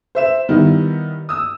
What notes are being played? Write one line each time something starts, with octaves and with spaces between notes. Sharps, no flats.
C5 E5 E7
D#3 G3 B3 D#4 E4
D#6 E6